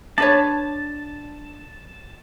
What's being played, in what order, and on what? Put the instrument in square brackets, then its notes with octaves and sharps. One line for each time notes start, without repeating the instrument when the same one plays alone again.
[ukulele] D4 B4 C#5 [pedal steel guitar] A5